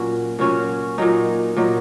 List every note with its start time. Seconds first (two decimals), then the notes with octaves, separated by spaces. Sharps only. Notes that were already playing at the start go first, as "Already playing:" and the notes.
Already playing: A#2 F#3 C#4 F#4
0.39 A#2 F#3 C#4 F#4
0.98 A#2 F#3 D#4
1.57 A#2 F#3 D#4